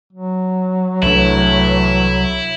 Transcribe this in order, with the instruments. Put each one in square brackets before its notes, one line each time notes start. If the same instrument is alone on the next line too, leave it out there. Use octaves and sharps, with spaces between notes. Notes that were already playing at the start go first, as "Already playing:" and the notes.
[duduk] F#3
[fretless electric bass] C2 D4 [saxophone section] A2 E3 [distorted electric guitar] E4